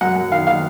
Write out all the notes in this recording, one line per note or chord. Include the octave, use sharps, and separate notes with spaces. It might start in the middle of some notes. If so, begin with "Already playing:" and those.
F#2 F#5
F#2
D#3 F5
D#3 F5